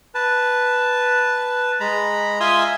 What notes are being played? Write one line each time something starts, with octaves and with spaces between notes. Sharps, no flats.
B4 A5
G#3 A#5 B5
F4 E5 G#5 C6 D#6 E6